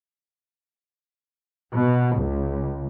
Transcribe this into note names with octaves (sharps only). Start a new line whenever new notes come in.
B2
C#2